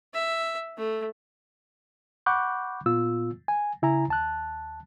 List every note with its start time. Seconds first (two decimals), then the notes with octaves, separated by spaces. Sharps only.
0.13 E5
0.77 A3
2.26 F#5 B5 C#6 D6 F#6 G6
2.86 A#2 B3 F4 E6
3.48 G#5
3.82 C#3 E4 G#5 A#5
4.08 D#2 A5 F#6